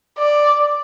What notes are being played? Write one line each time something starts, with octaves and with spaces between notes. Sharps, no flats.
D5